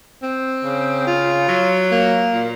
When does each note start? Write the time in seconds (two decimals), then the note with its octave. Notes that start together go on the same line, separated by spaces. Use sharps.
0.23 C4
0.65 C#3
1.07 F4
1.49 F#3
1.91 A#3
2.34 A#2